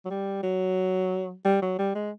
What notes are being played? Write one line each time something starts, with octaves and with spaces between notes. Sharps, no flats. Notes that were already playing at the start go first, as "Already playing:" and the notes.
F#3
G3
F#3
G3
F#3
G3
G#3